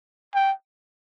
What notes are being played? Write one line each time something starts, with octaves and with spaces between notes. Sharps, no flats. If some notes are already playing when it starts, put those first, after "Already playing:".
G5